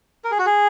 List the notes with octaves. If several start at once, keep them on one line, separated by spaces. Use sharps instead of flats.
A#4
G#4
F#4
G#4